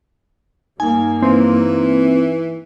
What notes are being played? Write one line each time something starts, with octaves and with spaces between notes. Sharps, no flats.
G2 A#3 D#4 G#5
E3 C4